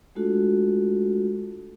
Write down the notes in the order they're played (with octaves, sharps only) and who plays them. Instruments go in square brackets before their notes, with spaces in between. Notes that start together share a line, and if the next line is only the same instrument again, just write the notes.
[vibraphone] G#3 A3 D4 F4 F#4 A4